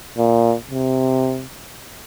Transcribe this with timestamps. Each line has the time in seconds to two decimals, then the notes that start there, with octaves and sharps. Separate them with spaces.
0.18 A#2
0.71 C3